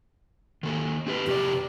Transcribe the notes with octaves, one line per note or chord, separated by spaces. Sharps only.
D#3 A#3 A4
C4 G4 B4
F2 C3 G4 D5